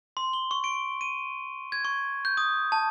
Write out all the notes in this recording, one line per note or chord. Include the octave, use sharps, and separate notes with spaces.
C6
G7
C#6
D7
D#7
G#6
C#6
G6
D#6
A5